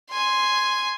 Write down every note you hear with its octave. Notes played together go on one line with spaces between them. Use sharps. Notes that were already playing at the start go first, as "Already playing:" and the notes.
G#5 C6